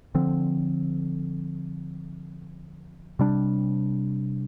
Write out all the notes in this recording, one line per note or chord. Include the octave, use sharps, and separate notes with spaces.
D3 F3 C4
C3 G3 D4